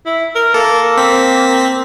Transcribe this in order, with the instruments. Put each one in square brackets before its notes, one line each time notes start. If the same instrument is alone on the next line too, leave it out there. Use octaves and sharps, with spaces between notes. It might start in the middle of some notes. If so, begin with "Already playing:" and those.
[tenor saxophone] E4
A#4
[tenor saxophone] A#3 [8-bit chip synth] A4
[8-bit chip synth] C4 B6